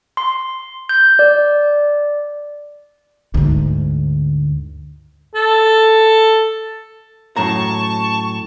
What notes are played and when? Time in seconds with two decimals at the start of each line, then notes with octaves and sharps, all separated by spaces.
0.17 C6
0.89 G6
1.19 D5
3.34 D2 G#2
5.35 A4
7.36 F#2 A2 A5 A#5 C#6